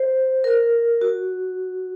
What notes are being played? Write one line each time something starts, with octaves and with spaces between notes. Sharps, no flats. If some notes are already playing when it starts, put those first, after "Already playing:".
Already playing: C5
A#4
F#4